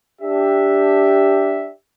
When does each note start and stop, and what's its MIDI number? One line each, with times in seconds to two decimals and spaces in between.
0.22 1.71 62
0.22 1.71 67
0.22 1.71 76